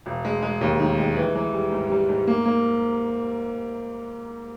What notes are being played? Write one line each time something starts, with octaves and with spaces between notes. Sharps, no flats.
E1
G#3
G#3
D#2
D#3
G#3
E3
E3
G3
G#2
G3
G#2
A#3
A#3